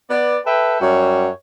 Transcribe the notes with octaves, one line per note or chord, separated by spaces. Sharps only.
B3 D5
A4 B4 E5 G5
F#2 G3 F#4 C#5